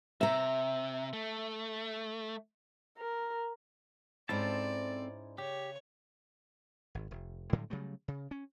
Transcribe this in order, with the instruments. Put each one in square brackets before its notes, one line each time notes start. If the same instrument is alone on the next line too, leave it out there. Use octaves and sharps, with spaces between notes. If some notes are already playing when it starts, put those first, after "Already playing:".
[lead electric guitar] C3 [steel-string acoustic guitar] E5 A#5
[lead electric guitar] A3
[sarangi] A#4
[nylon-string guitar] G#2 C#4 E4 [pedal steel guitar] C4 A4 A5 [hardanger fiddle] D5
[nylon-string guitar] C#3 [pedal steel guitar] G4 [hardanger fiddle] C#5
[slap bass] G#1
F1
A2 D3 F#3 G3
C#3 F#3 G3 A3
C#3
C#4